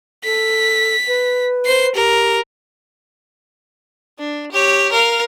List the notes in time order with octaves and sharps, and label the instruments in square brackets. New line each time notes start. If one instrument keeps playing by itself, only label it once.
[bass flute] A4 [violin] B6
[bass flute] B4
[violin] C5 C7
[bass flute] G4 [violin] A#4
[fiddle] D4
G4 C#5
A#4 F5